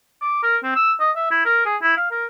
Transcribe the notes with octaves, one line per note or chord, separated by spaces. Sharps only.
D6
A#4
C4
E6
D#5
E5
E4
A#4
G#4
E4
F5
A#4